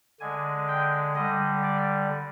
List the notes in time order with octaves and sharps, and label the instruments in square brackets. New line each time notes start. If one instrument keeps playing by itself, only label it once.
[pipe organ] D3 G#3 G#5
G5
D3 G3 D#5
D5